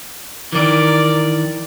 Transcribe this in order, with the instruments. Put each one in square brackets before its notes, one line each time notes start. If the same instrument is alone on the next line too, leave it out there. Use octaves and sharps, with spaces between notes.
[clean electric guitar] D#3 E3 [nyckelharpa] A#4 D5